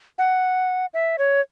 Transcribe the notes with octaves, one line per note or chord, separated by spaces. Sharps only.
F#5
E5
C#5